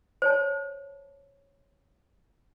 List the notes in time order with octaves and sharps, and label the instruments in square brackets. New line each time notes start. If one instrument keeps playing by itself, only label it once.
[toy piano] C5 C#5 A5